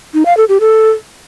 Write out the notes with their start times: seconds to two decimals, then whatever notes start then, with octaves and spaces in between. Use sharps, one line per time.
0.14 D#4
0.26 F5
0.37 A4
0.49 G4
0.60 A4